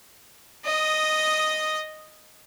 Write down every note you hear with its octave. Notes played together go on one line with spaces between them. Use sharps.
D#5 D#6